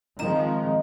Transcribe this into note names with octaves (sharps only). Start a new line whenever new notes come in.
D#3 F3 G#3 C4 D#5 A#5